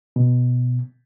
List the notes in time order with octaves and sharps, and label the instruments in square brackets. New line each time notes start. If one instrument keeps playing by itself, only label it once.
[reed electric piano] B2